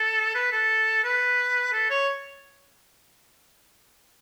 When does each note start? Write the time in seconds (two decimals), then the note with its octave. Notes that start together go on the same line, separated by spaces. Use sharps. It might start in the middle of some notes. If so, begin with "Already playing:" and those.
Already playing: A4
0.35 B4
0.52 A4
1.04 B4
1.73 A4
1.90 C#5